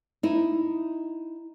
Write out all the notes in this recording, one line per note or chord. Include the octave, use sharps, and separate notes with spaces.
D#4 E4